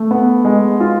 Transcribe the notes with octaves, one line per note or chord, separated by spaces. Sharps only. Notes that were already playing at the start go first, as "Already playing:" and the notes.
Already playing: A3
B3
G#3
F4